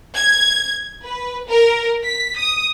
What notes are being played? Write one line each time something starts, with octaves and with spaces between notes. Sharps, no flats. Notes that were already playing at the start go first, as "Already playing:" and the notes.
G#6
B4
A#4
B6
D#6